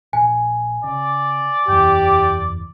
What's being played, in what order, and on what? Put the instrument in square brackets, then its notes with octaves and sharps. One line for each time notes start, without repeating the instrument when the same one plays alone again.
[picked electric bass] A#1 [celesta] G#5
[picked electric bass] C#3 [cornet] D5
[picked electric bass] F#1 E2 [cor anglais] G4